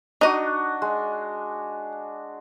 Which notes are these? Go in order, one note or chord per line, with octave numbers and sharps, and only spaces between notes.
D4 D#4 F#4 D#5
G#3